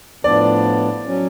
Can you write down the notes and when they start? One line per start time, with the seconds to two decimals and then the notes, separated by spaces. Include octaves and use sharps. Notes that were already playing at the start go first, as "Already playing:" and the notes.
0.24 A2 F3 B3 D4 D5
1.05 F#3 C#4